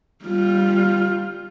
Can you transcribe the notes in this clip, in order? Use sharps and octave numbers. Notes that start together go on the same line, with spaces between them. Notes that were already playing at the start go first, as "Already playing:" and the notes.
G3 F4